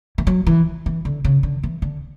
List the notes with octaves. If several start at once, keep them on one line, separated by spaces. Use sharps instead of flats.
E3
F#3
E3
E3
D3
C#3
D3
E3
D3